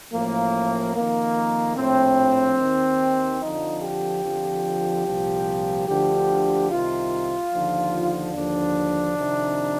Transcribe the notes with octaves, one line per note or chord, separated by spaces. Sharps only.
A1 A2 F3 A#3
F2 D#3 A#3
A#1 A2 F3 C4
D#2 D#3
F2 D3 F3 D#4
G4
F2 D3 F3
C2 A#2 F3
D2 D3 F3 G4
C2 C3 D#3 F4
D#2 D3 F3
D#2 D3 F3 D4
F2 C3 D#3